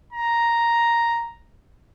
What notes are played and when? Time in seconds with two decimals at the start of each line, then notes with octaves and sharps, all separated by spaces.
0.13 A#5